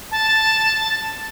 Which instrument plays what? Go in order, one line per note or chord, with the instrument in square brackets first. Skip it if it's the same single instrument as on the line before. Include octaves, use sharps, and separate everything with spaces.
[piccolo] A5